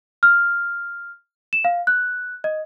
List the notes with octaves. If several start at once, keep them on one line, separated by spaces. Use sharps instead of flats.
F6
E7
F5
F#6
D#5